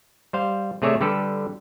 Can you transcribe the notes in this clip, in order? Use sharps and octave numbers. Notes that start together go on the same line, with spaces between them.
G3 C5 F5
C3 A3 G#4 C#5 D5 E5
D3 G3 G4 A4 B4